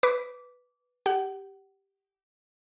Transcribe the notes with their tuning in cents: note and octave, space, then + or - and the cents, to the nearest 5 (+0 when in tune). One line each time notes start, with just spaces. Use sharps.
B4 +0 D6 -20
G4 +0 F#5 +35